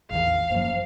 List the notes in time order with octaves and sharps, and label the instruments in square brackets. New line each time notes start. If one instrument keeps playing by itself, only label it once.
[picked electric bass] A1 E2 D#3 [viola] F5
[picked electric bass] F#1 F#2 [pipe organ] F3 A#3